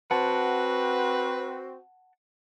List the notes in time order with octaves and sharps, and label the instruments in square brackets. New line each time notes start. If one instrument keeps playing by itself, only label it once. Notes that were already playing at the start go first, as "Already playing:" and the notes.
[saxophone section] C4 F#4 [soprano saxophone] B4 [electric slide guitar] F#5 A5